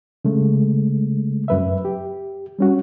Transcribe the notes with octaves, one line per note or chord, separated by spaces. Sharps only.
C#3 G#3 A3
F#2 B4 E5
G4
G3 C#4 F#4